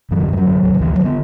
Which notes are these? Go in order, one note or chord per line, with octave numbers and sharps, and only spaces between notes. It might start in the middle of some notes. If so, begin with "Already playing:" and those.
F#2 E3
D3
F#2 E3 G3
F#3
D3
D2
D3
D2 E3
F#3
D3
B3